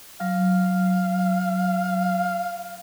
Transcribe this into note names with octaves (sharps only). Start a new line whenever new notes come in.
F#3 F5